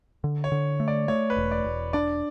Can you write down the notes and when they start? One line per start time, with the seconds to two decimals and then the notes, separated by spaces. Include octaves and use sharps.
0.24 D3
0.44 C#5
0.52 D3
0.80 A3
0.88 D5
1.08 A3 C#5
1.30 B4
1.37 E1
1.51 D5
1.64 E1
1.93 D4 D5